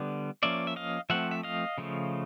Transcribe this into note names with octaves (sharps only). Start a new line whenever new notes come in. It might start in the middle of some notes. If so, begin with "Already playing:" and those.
Already playing: D3 G3 B3
F3 A#3 C#4 D5 E5
E5
D#5 F5
F3 A3 C4 E5 F#5
E5
D#5 F5
C#3 F3 A3